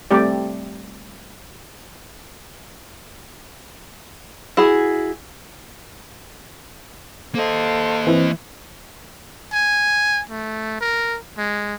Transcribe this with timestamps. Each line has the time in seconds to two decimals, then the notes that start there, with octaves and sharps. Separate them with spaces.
0.11 G3 A3 C4 G4 D5
4.57 E4 F#4 G#4
7.35 A#3 A4 C5 D#5 F5
8.07 E3 C4
9.53 G#5
10.29 A3
10.81 A#4
11.37 G#3